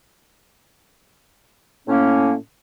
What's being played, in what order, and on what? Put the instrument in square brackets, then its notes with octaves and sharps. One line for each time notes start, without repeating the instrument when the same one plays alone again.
[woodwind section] A2 A#3 C#4